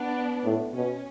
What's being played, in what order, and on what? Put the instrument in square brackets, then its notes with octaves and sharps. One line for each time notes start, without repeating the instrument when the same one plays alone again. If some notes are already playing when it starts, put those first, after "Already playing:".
Already playing: [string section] B3 D4
[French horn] A2
[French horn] B2 [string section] C#4